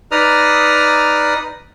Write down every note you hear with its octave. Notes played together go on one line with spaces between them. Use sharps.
D#4 B4 D5 A#5 D#6 F6